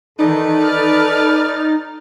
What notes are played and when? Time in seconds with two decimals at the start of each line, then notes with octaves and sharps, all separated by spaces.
0.19 D#3 E3 D#4 A4 B4 D5
0.64 F6 A6